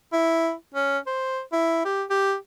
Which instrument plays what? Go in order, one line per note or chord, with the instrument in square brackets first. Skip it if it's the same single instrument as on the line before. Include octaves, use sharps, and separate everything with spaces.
[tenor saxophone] E4
C#4
C5
E4
G4
G4